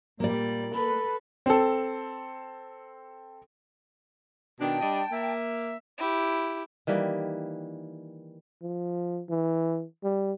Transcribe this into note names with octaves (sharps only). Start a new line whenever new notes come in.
A#2 G3 A#3 D5
A4 B4 B5
C4 A4
B2 D#3 D4 G5 A5
G3 D4 D#5
A#3 E5
E4 G4
D#3 E3 G3 A#3
F3
E3
G3